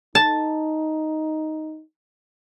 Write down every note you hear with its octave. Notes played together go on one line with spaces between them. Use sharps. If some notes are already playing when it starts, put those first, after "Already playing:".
D#4 A5